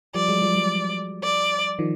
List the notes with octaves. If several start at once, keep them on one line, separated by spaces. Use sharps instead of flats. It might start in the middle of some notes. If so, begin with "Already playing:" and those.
F3 G3 D5
F#3 G#3
F3 G3
F3 G3
D5
D#3 F3